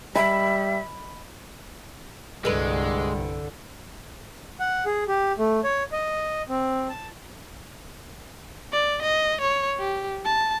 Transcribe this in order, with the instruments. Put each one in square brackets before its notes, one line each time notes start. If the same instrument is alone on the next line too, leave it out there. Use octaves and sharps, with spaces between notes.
[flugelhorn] G3 [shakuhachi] E5 [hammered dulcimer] B5
[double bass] C2 G2 [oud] D3 B4 [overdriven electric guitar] G#3
[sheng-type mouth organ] F#5
G#4
G4
A3
C#5
D#5
C4
A5
[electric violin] D5
D#5
C#5
G4
A5